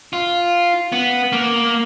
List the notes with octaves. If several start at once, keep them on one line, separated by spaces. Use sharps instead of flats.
F4
B3
A#3